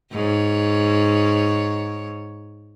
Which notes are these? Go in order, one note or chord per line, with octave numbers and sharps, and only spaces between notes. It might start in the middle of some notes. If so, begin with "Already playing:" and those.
G#2 C#5